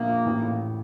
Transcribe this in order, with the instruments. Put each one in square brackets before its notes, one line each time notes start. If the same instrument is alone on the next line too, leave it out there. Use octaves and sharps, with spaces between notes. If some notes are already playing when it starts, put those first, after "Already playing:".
Already playing: [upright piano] A#1 [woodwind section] A#3
[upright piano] A#2
A1
A2